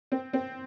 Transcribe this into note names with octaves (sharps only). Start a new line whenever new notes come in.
C4
C4